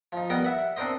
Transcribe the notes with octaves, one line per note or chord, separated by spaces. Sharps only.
F3 D#4
G3 B3 A#4 D#5 G5
E5 F#5
C4 D4 D#4 A#4 C5 D#5